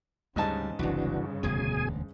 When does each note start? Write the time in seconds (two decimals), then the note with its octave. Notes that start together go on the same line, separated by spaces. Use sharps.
0.36 D2 G#2 C#3 G3 D#5 A5
0.79 F#1 C2 G2 C#3 E3 D4 F#4
1.43 E1 D2 B2 G#4 G#5